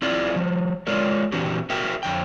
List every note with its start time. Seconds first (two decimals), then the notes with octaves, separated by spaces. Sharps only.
0.02 C4 E4 F4 G#4 D5
0.36 F3 G3
0.87 G#3 F4 G#4 A#4 C#5 D5
1.32 A#2 E3 C4 D4 F#4 G4
1.70 F#4 G#4 A#4 E5 G5
2.03 F2 D3 G5